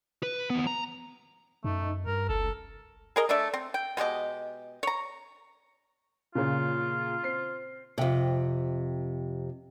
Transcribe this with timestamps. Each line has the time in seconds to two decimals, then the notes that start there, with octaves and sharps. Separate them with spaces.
0.23 B4
0.50 D#2 B3
0.67 A#5
1.64 F#2 A3 D#4
2.06 G2 A#4
2.29 F#1 C#2 A4
3.16 G#4 A#4 D#5
3.29 A3 D4 D5 E5
3.54 C4
3.74 G5
3.97 B2 G#3 G4 D#5
4.83 C#5 A#5
6.35 A#2 C#3 F4
7.23 C4 C7
7.98 F2 C3